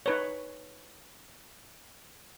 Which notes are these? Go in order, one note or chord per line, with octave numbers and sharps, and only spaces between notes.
D#4 B4 C#5